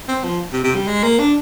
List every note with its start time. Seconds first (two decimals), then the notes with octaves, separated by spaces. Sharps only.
0.08 C4
0.24 F3
0.52 C3
0.64 C3
0.75 G3
0.88 G#3
1.03 A#3
1.19 D4